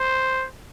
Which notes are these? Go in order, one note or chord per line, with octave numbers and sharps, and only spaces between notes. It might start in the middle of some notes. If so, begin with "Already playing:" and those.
Already playing: C5